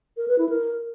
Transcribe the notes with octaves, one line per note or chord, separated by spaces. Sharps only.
A#4
B4
E4
A#4